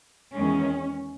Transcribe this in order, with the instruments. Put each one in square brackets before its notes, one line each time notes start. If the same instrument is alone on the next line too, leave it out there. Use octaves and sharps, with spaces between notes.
[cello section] E2 D#3 G#3 C#4